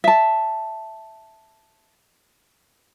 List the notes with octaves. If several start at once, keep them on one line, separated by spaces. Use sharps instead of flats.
E5 A5